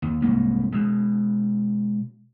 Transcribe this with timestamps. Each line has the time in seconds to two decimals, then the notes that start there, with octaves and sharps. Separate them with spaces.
0.02 D#2
0.22 C2 G#2 A#3
0.72 B2 G#3